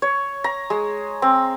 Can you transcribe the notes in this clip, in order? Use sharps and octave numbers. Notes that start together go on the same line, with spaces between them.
C#5
A#5
G#3
C4